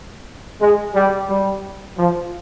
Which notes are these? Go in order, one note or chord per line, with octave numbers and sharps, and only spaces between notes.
G#3
G3
G3
F3